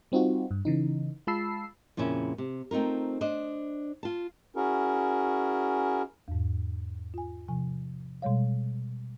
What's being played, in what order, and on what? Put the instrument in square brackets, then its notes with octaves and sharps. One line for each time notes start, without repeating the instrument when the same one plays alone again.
[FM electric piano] G3 C4 D#4 F4 F#4
G2
C#3 E3 D#4
G#3 F4 A5 B5 E6 C7
[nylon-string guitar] F2 A#2 C#3 C#4 E4
C3
A3 C4 D#4 F4 A#4
D4 C5 D#5
F4 A5
[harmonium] C#4 E4 F#4 G#4 A#4
[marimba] E2 G#2
F4 G#5
C3 F3 G#5
B2 G3 G#3 C#5 F5